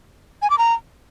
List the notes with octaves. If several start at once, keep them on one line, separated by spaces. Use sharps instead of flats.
G#5
D6
A#5